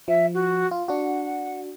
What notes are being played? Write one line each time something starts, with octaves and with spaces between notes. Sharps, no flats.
F3 E5
F#4
F4
D4 F#4 F#5